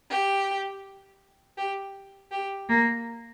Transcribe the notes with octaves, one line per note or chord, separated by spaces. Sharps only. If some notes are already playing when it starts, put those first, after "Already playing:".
G4
G4
G4
A#3